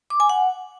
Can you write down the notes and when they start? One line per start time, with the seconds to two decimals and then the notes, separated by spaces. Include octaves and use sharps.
0.10 D6
0.20 G#5
0.29 F#5